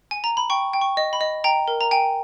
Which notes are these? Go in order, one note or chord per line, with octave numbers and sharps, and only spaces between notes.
G#5
A#5
B5
G5 C#6
G5
C#6
D#5
B5
D#5
G5 A#5
A#4
A#5
G5 G#5